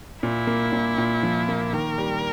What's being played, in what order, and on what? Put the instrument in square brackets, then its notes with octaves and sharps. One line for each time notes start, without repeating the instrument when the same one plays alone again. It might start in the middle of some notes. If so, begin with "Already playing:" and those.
[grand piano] A#2 [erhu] E4
[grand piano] A#3
A#2
A#2
F3
A#3
[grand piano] D#3 [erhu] A#4
[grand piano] G3